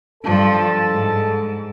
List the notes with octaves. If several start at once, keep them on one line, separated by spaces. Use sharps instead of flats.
G2 F3 A4 A5
G#2